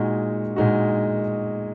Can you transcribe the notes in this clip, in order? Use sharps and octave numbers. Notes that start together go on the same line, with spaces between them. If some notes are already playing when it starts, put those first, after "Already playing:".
Already playing: A#2 G#3 D#4 F#4
A#2 G#3 D#4 F#4